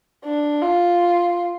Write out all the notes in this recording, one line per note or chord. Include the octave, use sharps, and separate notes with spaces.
D4
F4